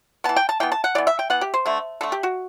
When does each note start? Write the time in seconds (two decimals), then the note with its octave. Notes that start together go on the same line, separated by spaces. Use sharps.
0.24 E3 B3 A5
0.36 G5
0.49 A5
0.60 E3 B3 G5
0.72 A5
0.84 F#5
0.95 E3 B3 D5
1.07 E5
1.19 G5
1.30 E3 B3 F#5
1.41 G4
1.54 C5
1.66 D3 A3
2.01 D3 A3 A4
2.12 G4
2.23 F#4